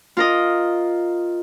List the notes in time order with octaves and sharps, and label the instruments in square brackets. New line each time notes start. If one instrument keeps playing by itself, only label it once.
[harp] F4 A#4 D#5